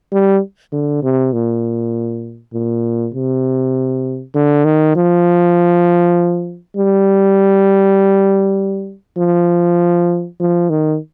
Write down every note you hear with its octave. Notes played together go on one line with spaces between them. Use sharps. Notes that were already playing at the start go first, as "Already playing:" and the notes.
G3
D3
C3
A#2
A#2
C3
D3
D#3
F3
G3
F3
F3
D#3